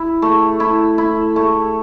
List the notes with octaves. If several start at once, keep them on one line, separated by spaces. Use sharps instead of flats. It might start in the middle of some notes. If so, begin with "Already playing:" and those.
Already playing: E4
A3
E4
E4
A3